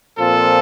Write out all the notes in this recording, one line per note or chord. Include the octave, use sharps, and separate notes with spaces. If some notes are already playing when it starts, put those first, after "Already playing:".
A#2 F3 C4 F4 A4